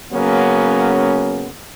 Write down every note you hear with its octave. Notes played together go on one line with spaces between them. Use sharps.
C#3 F#3 A#3 B3 C#4